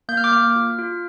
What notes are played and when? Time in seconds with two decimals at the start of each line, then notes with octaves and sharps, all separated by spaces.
0.09 A#3 G6
0.17 F6
0.24 D6
0.32 A#3 F6
0.56 F4
0.78 F4